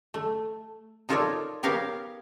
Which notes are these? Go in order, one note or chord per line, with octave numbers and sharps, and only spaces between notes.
A3
D#4 F4 A4 A#4 C#5 D5
B3 G4 A#4 C#5 F5 G5